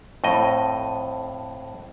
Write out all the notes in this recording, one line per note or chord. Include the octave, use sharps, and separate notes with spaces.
F2 A2 D#5